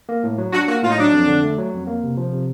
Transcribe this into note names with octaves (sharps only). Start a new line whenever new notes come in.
A#3
A2
F#3
D4 F#4
A#3 F#4
A2 F4
D#4
F#3 D4
F2
D3
A3
F#3
F2
A#3
C3
F3
C3